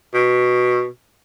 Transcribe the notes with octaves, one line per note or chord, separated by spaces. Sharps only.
B2